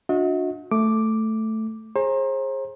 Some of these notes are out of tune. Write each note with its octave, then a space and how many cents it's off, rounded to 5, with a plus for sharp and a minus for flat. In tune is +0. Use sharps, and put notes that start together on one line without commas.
D4 +0 F#4 -35 D#5 +40
A3 +0 D6 +0
G#4 +0 C5 +40 A#5 +5